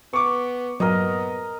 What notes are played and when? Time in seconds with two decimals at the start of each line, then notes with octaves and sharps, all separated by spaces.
0.13 B3 C#6 D6
0.80 G2 A#2 F#3 B3 A#4 D#5